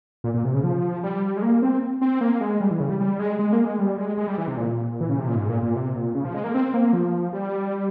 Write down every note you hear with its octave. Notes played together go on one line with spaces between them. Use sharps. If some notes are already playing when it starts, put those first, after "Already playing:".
A#2
A#2
C3
C#3
F3
G3
G#3
A#3
C4
C4
A#3
G#3
G3
E3
C#3
G3
G3
G#3
G#3
A#3
G#3
G3
G#3
G#3
G3
E3
C3
A#2
E3
C#3
C3
A#2
G#2
A#2
A#2
C3
A#2
C#3
F3
G#3
A#3
C4
A#3
F3
G3